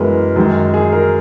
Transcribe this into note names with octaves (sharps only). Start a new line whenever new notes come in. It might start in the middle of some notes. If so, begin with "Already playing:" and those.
Already playing: F#2 E3 G#3 B3 A#4 B4
F#2 D#3 G#3
G#4
A#4